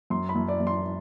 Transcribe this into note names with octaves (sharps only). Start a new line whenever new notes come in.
F#2 C6
B5
F#2
D5
F#2
C6